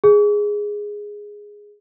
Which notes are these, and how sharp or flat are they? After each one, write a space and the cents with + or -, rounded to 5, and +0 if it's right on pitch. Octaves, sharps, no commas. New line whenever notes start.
G#4 -5